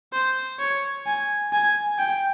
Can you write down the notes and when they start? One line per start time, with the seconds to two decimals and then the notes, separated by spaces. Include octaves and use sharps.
0.13 C5
0.59 C#5
1.06 G#5
1.53 G#5
1.99 G5